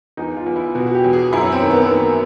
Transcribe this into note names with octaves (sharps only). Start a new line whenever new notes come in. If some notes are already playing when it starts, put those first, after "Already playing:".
E2 D#4
F4
E2
E4
B2 F#4
F#4
G4
E2
G#4
F#2 E4
C#4
C4
D#3
B3
B3
D#3 A#3